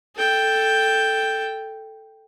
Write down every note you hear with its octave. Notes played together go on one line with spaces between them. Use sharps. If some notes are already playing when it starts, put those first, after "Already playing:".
A4 G5